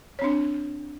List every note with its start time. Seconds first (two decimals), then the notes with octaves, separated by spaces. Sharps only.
0.19 C#5
0.21 C4
0.24 D4